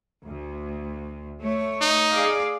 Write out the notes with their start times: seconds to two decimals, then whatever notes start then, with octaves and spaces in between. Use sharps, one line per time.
0.23 D2
1.40 A3 C#5
1.81 D#4
2.13 G#4 D5 F5